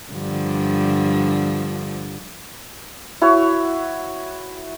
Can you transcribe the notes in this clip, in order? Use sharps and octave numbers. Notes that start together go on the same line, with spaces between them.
G2 D3 F3
E4 F#4 C#5